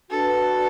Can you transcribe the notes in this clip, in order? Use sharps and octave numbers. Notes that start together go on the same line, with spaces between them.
D4 F#4 A4 B4